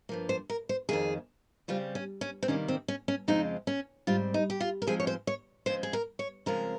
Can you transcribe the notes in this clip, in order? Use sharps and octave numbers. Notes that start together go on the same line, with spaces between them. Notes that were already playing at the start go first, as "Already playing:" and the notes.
G2 F3 A#3
C5
A#4
C5
F2 D#3 A#3 G#4
C#3 G3 C4 F4
C#4
C#4
C4
C3 D#3 G3 A#3 C#4
C4
C#4
C#4
F2 C#3 F3 G#3 C4 D#4
C#4
G#2 G3 C4 F4
D#4
G4
F4
A#4
G#2 F3 G#3 C4 G#4
C#5
C5
C#5
C#3 F3 G#3 C4 C5
G#4
A#4
C#5
C#3 F3 G#3 C4 A#4